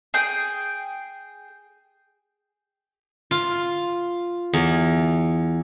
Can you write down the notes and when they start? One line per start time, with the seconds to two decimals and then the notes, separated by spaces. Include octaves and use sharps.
0.14 G#4 G5
3.31 F4
4.53 E2